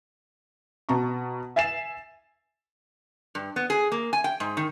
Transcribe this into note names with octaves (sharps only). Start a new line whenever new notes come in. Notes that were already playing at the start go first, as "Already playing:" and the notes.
B2 A5 A#5 C#6
E5 G#5 A6 C7 E7
G2
B3
G#4
A#3
G#5
G5
G#2
D#3